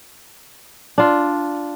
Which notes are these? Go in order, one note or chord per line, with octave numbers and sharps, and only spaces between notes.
D4 F4